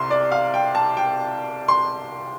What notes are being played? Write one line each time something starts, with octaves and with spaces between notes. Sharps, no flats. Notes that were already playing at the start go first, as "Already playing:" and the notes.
Already playing: C2 C3 C6
D5
F5
G5
A5
G5
C6